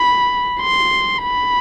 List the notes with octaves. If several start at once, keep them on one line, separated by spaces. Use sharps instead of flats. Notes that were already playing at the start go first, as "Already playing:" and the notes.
Already playing: B5
C6
B5